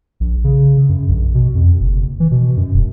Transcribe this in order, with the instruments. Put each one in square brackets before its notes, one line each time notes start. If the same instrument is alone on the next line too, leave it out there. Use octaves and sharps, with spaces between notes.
[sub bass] A#1
C#3
F#2
A#1
B2
F2
F#1
E3
B2
F#2
E1